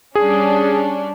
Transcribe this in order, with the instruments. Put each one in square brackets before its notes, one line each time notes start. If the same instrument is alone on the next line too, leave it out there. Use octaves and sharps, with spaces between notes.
[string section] G3 C#4 D4 [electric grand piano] G#4